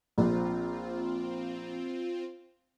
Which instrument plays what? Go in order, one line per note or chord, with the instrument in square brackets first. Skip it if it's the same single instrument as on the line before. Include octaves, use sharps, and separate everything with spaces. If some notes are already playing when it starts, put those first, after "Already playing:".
[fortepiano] A#1 [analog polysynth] C4 F4